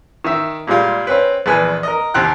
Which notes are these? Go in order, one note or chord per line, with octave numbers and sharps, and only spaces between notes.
D#3 E5
A#2 G3 G#3 F4
C4 C#4 B4
A#1 E2 G#4 B4 G#5
A#4 D#5
D#2 C3 G5 F#6